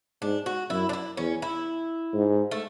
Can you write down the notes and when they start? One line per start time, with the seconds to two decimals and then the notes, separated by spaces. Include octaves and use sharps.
0.22 G#2 D4
0.46 F#4
0.70 F#2 E4
0.89 D4
0.93 E4
1.17 E2 C#4
1.42 E4
2.14 G#2
2.51 A3